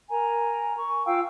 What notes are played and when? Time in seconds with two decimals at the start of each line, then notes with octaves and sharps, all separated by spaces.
0.09 A#4 G#5 A#5
0.76 C#6
1.06 F4 F5 G5 E6